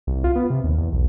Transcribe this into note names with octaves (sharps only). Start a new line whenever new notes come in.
C2
F4
B3
C3
D#2
E2
B1